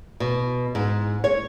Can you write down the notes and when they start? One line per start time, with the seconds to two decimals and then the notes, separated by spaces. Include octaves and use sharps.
0.20 B2
0.75 G#2
1.24 C#5